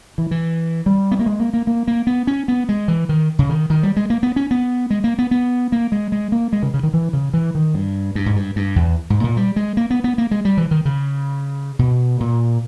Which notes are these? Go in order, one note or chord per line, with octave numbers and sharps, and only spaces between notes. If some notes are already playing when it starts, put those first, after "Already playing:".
E3
E3
G3
B3
A#3
G#3
A#3
A#3
A#3
A#3
B3
C#4
B3
G#3
E3
D#3
C#3
D#3
D#3
G3
G#3
A#3
B3
C#4
B3
G#3
A#3
B3
B3
A#3
G#3
G#3
A#3
G#3
C#3
C#3
D#3
E3
C#3
E3
D#3
G2
G2
G#2
G2
G2
E2
G#2
A#2
G3
G#3
A#3
B3
B3
A#3
G#3
G3
E3
D#3
C#3
B2
A#2